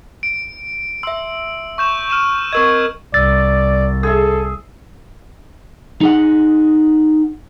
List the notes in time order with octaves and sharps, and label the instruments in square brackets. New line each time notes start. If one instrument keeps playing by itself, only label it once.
[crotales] D7
[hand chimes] E5 C6 [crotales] E6
[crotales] C#6 G6 E7
F6 D#7 E7
[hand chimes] C4 A#4 D#5 [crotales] C#6 E6 G#6
[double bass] C2 [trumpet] D5 [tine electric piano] E6 A6
[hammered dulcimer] G#4 E5 [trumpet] A4
[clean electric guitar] D#4 G#4 F#5